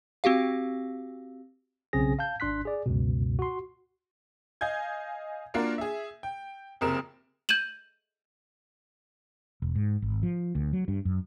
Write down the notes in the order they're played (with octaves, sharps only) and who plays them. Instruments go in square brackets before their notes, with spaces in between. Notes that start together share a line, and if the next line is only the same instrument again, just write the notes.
[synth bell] C4 F#4 G4 F5
[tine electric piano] B1 C#3 C4 C#4 G#4 A#6
F5 A5 G6
G#1 D4 C6 F#6 B6
G#4 D5
C#2 F#2 B2
F#4 C6
[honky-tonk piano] D#5 F5 G#5 G6 G#6
A#3 D4 F4 F#4 A#4
G#4 E5
G5
F#1 F2 C3 A#4 D#6 E7
[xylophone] G6 G#6 D#7 E7 F#7
[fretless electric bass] E1
G#2
G#1
F3
D2
F#3
G2
F#2